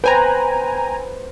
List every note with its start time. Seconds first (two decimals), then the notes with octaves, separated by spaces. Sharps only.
0.04 B4 C5 G5 G#5 A#5